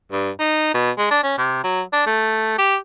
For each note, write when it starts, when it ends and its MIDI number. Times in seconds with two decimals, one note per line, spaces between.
0.12 0.31 43
0.39 0.71 63
0.74 0.91 47
0.98 1.10 56
1.11 1.19 62
1.23 1.36 61
1.37 1.60 48
1.64 1.82 54
1.93 2.05 62
2.06 2.56 57
2.58 2.77 67